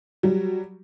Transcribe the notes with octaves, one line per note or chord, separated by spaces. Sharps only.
F#3 G3